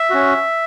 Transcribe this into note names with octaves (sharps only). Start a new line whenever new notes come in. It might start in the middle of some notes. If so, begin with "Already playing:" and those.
Already playing: E5
C#4 F#4